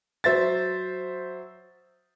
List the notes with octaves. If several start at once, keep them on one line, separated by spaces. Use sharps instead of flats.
F#3 C5 E5 A6